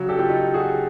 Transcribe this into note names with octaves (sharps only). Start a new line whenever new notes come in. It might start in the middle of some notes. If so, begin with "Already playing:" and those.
Already playing: C#3 F#3
G4 A4
F4 G4
D#4 F4
F#4 G#4